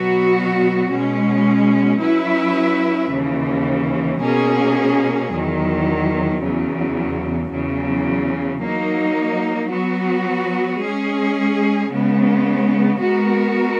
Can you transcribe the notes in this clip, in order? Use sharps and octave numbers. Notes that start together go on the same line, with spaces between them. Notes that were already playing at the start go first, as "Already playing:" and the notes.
Already playing: B2 F#3 B3 F#4
B2 G#3 C#4
F#3 C#4 E4 B4 E5
D#2 C#3 E3
B2 A#3 C#4 G#4
E2 D#3 F#3
E2 C#3 F#3
E2 C#3 F#3
F#3 A#3 D#4
F#3 B3 F#4
G#3 C#4 G#4
C#3 G#3 B3
G#3 B3 F#4 A#4